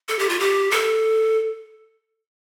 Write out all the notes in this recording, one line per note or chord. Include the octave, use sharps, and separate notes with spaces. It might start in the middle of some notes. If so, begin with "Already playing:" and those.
A4
G4
F4
G4
A4